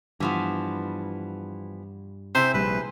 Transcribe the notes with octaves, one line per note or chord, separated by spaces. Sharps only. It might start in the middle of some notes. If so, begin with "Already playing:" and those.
G2 E3 F3 B3
C3 E4 G#4 C5
A#1 G3 B4